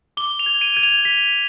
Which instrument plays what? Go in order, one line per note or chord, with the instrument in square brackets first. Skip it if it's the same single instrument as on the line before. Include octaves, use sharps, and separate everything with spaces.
[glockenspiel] D6 [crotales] G7
[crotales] F7
[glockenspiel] G#6
[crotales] D#7
[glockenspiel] G#6
[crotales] F7
[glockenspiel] B6